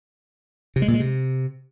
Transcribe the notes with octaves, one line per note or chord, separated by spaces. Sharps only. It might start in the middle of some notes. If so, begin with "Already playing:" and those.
C3
G#3
A#2
G#3
C3